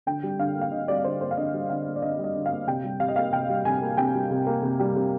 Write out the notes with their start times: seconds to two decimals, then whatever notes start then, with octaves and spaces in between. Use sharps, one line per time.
0.06 D3 G5
0.23 G3
0.39 D3 F5
0.56 A#3
0.61 F5
0.72 D3 D#5
0.88 G3 D5
0.99 D5
1.05 D3 C5
1.21 A#3 C5
1.31 F5
1.37 D3 D#5
1.54 G3
1.70 D3 F5
1.86 A#3
1.96 D5
2.02 D3 D#5
2.18 G3
2.24 D#5
2.35 D3
2.46 F5
2.51 A#3
2.67 C3 G5
2.84 G3
3.00 C3 F5
3.08 D#5
3.16 A#3 F5
3.33 C3 G5
3.49 G3
3.65 C3 G#5
3.82 A#3
3.97 C3 G5
4.14 G3
4.31 C3
4.47 A#3
4.63 C3
4.80 G3
4.96 C3